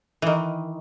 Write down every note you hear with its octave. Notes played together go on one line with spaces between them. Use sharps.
D#3 E3